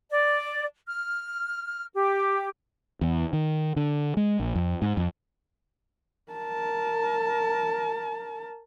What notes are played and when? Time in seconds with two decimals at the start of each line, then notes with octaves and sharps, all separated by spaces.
0.10 D5
0.87 F6
1.94 G4
3.01 E2
3.33 D#3
3.76 D3
4.17 G#3
4.40 A#1
4.55 F2
4.82 G#2
4.97 F2
6.32 A#4 A5